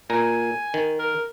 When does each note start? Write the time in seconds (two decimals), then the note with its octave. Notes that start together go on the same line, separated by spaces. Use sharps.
0.10 A#2 G#5 A#5
0.74 D#3
0.99 A#4